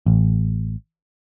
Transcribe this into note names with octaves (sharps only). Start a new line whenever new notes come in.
A1